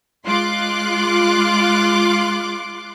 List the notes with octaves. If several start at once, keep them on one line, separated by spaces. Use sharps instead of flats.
G#3 F4 C6 D6 F#6